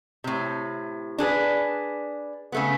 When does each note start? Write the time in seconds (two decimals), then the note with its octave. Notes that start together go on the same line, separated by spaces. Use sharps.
0.24 A2 C3
1.18 D4 G#4 A4 B4
2.52 C#3 A3 B3